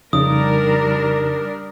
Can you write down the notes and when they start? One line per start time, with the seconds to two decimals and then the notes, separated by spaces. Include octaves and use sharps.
0.13 F2 C#3 G3 D4 D#4 A#4 D#6